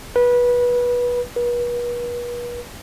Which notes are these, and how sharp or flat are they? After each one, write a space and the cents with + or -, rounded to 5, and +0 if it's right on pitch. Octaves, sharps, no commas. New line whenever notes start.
B4 -20
B4 -40